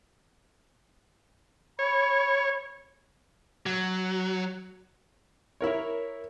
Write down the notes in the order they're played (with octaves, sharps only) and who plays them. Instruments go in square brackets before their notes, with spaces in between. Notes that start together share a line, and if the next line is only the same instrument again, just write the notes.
[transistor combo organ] C#5 [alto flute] B5
[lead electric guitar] F#3
[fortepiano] E4 A#4 C#5